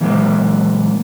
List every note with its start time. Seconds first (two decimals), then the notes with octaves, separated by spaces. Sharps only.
0.01 A#2 E3 F#3 G#3 A#3 B3